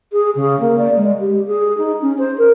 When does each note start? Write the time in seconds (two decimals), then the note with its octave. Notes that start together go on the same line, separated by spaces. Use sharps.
0.13 G#4
0.35 C#3
0.60 A#3
0.78 D5
0.96 G#3
1.20 G4
1.47 G#4
1.78 D#4
2.02 C#4
2.18 C5
2.38 A#4